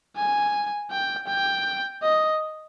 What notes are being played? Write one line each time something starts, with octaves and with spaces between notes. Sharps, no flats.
G#5
G5
G5
D#5